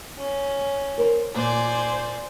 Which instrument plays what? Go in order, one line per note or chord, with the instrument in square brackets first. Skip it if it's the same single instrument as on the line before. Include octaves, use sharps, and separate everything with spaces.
[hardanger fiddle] C#4
[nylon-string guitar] A#4 C5
[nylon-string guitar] A#2 [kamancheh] C5 [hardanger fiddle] D5 G#5